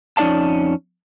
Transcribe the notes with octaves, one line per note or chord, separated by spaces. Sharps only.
F2 C#4 D#4 D5 F5 A5